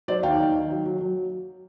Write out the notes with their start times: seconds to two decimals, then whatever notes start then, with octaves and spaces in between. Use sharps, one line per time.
0.08 F#3 C5 D5
0.23 D#2 F5 G5
0.40 D#3
0.54 D#3
0.70 F#3
0.86 F#3
1.01 F#3